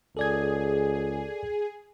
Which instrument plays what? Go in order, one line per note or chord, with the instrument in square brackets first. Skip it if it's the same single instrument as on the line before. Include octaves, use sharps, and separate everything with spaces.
[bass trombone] C#2 [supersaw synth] G#4 [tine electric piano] A4 D5 G#6